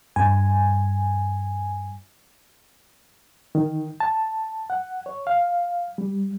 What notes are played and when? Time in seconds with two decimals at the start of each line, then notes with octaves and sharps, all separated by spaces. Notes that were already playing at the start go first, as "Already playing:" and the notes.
0.16 G2 G#5
3.55 D#3
4.00 A5
4.70 F#5
5.06 C#5
5.27 F5
5.98 G3